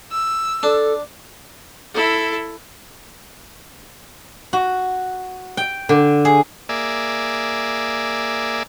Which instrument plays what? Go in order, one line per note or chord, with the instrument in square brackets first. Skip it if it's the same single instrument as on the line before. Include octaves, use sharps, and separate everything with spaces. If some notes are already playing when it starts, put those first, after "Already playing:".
[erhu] E6
[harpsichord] D4 [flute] A4
[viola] E4 A4
[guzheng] F#4
G5
D3
G#4
[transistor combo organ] A#3 G#4 D5 E5